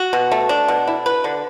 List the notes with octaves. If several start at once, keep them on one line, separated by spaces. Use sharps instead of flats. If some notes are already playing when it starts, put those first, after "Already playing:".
Already playing: F#4
B2
A3
D4
B2
E4
B4
D3